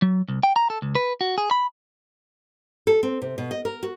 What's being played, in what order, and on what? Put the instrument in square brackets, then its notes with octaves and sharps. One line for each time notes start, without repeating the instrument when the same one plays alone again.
[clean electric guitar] F#3
C2
G5
A#5
A4
C#2
B4
F#4
G#4
B5
[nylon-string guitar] A4
C4
C3
B2
D#5
A#4
F#4